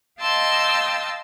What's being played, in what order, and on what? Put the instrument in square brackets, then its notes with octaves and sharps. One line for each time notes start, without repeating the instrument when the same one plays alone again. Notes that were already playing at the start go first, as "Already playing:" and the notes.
[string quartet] D#5 F5 G5 A5 C6 E6